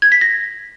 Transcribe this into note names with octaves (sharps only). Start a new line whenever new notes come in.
G#6
B6
A#6